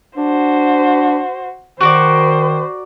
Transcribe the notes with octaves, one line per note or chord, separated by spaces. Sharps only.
D4 F#4 C5
D#3 F#4 A#4 C5 D5